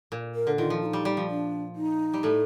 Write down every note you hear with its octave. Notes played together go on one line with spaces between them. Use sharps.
A#2
A#4
D3
D#3 F4
F3
F4
D#4
G3
G3
F3
D4
D#4
G3
A2 A3